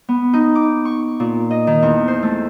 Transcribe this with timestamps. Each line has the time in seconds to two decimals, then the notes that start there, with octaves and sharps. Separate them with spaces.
0.09 B3
0.33 D#4
0.55 D6
0.85 C#6
1.20 A#2
1.51 D#5
1.67 D#3
1.82 E2
2.08 C5
2.23 A3